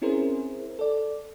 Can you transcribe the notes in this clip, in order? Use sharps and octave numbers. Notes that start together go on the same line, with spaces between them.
C4 C#4 E4 G#4 A#4 C5
A4 D5